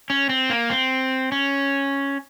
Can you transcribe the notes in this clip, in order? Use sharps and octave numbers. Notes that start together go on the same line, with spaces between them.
C#4
C4
A#3
C4
C#4